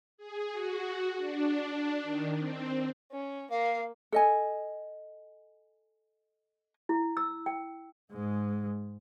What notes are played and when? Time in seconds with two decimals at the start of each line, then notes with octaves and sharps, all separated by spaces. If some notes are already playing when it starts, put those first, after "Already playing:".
0.17 G#4
0.52 F#4
1.17 D4
2.03 D#3
2.38 C4
3.12 C#4
3.51 A#3 F5
4.12 A4 D#5 G#5
6.89 E4
7.17 E6
7.46 G5
8.13 G#2 G#3